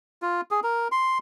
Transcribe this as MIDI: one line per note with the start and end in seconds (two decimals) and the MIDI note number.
0.22 0.41 65
0.51 0.60 68
0.64 0.88 70
0.92 1.18 84